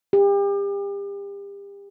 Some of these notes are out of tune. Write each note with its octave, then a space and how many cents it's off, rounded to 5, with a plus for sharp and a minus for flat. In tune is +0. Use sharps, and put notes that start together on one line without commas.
G4 +35